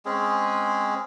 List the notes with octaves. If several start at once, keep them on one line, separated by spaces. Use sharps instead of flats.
G#3 C4 C#4 G#4